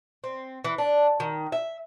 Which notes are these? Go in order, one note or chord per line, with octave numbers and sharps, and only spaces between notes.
C4
E3
D4
D#3
E5